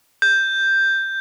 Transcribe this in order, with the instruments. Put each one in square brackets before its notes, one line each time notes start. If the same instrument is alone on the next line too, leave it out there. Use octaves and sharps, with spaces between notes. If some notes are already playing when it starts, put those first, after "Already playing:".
[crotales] G6